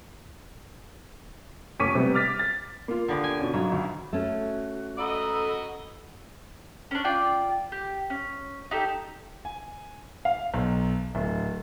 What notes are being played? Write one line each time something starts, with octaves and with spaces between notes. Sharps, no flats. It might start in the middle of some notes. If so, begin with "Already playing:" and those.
F1 C#4 C#6 D6 B6 D#7
C3 G3 B3
D6 F6 A6 B6
A6
A#3 F4
D3 B3 G4
G#5
B2 C#4
G#2 C#3 F#3
D2
A3 C#4 F#4
F#4 A4 D#5 A#5 B5 D#6 E6
C#4 D4
F4 D5 G5
G4
C#4
D#4 G4 A4
G#5
F5
B1
D1